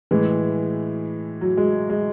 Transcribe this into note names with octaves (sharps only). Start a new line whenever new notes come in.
A2 E3 G#3
F#3
G#3
G#3